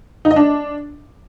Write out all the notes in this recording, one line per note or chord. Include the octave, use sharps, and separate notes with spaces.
D#4
D#5
D4